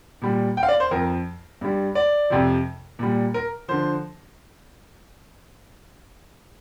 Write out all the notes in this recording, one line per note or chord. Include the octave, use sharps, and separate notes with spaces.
A#2 G3
G5
F5
D5
C5
F2 F3 A#4
G2 G3
D5
F2 C3 F3
A#2 G3
A#4
D3 F3 C5